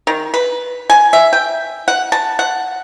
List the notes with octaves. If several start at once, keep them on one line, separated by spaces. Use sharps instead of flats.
D#3
B4
G#5
E5
G5
F#5
A5
F#5